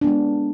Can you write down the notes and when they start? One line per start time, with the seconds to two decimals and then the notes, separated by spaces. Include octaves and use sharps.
0.01 D4
0.04 B3
0.07 G#3